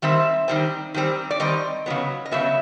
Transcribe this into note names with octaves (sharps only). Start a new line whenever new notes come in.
D#3 G3 C4 E5
D#3 G3 C4
D#3 G3 C4
D5
D#3 G3 C4 D#5
C#3 F#3 B3
D#5
C#3 F#3 B3 E5